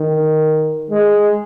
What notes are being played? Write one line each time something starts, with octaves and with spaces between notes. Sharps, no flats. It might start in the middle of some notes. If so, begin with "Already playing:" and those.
Already playing: D#3
G#3